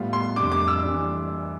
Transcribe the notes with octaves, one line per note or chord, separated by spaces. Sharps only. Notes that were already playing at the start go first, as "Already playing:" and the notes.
Already playing: A2 G3 B3 F4
C6
F2 C3 G3 D4 D6
D6
E6
E3 G3 D4